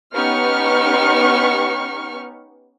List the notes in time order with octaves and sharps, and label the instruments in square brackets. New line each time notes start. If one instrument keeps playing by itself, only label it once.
[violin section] B3 C#4 D#4 G4 C#6 F6